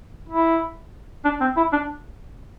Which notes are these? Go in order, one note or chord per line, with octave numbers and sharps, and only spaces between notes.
E4
D4
C4
E4
D4